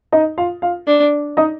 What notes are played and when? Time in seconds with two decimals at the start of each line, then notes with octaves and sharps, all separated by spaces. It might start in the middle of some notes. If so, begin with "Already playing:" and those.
0.12 D#4 D#5
0.38 F4 F5
0.62 F4 F5
0.87 D4
1.37 D#4 D#5